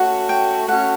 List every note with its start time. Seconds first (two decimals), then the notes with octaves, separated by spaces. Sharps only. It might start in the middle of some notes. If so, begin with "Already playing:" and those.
Already playing: A3 C#4 F#4 F#5
0.29 G5
0.68 A3 C#4 F#4 F#5